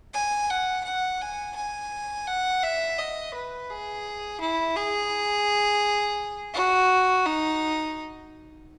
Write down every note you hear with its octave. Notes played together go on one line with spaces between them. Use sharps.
G#5
F#5
F#5
G#5
G#5
F#5
E5
D#5
B4
G#4
E4
G#4
F#4
D#4